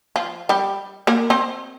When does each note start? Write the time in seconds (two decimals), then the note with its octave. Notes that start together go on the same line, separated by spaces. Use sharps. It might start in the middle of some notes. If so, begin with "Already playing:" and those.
0.16 F3 F4
0.49 G3 G4
1.07 A#3 A#4
1.30 C4 C5